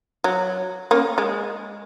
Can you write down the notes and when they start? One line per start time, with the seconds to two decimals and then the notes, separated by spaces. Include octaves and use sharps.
0.24 F#3
0.91 A#3 C#4
1.18 G#3